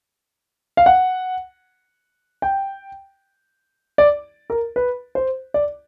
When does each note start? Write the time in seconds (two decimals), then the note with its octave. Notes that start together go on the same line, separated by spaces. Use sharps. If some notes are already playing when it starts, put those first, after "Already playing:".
0.77 F5
0.86 F#5
2.42 G5
3.98 D5
4.50 A#4
4.76 B4
5.15 C5
5.54 D5